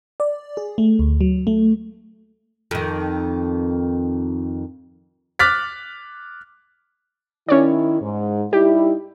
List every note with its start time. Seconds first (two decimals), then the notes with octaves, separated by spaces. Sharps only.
0.20 D5
0.57 G#4
0.78 A3
0.99 D2
1.21 F#3
1.47 A3
2.71 F2 D#3
5.39 D6 F6 F#6 A6 B6
7.49 D#3 C#4 E4 C#5 D5
8.01 G#2
8.53 G3 D#4 E4 G4